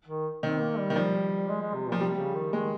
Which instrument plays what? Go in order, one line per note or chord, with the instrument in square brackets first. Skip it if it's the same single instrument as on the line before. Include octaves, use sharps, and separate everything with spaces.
[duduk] D#3
[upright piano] D#3 [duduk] C4
[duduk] A#3
G3
[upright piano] D#3
[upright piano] F3 [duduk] G3
[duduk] G#3
G#3
C3
[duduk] A#2 [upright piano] F3
[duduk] C3 [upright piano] G3
[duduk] C#3
D#3
[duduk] D#3 [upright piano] G#3